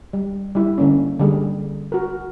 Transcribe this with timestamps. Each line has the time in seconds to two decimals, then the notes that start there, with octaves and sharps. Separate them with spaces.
0.13 G3
0.55 G3 E4
0.78 D3 A#3 C#4
1.19 D3 G3 G#4
1.92 F#4 A#4